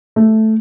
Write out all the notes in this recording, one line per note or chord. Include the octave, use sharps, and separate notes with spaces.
A3